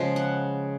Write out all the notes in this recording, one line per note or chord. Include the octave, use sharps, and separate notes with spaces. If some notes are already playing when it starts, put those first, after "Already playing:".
Already playing: C#3 F3 G#3
F#5